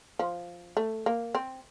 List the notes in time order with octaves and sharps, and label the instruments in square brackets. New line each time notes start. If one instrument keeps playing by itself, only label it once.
[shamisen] F3
A3
A#3
C4